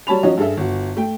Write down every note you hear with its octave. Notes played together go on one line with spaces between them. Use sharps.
F#3 G3 C#5 A5 B5 F7
F3 F#3 C#4 F#4 C#5 D#5
G2 G#4 A4 E5
G1 F#4
A3 G5